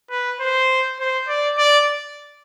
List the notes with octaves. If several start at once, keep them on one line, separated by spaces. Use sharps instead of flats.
B4
C5
C5
D5
D5